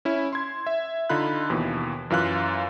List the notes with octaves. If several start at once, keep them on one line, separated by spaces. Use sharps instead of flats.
C#4 E4
C6 G#6
E5
D3 D#4 F4 B5 F#6
D#2 B2 E3
F#2 E3 F4 F5 F#6